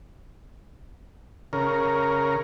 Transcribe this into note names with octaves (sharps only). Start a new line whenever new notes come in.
C#3 A#4